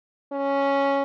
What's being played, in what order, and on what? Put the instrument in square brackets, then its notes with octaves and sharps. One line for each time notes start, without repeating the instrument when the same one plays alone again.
[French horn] C#4